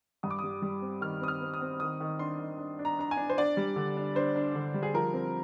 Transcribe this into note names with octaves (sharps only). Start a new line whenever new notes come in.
G2 D#6
D6
G3 D#6
G3
C4
D#3 F6
C4 D#6
F6
C4
D#6
C4
D#3 D#6
D#3
D4 C6
D#3
D4
D4
A#5
D4 A#5
G#5
D4
C5
D4 D5
G3
D3
D4
D4 C5
D4
D3
G3
G#4
F3 A#4
C4